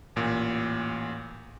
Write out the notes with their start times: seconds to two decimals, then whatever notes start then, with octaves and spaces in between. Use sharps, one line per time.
0.16 A1 A#2